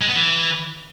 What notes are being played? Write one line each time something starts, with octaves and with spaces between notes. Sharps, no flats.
G#3
B3
E3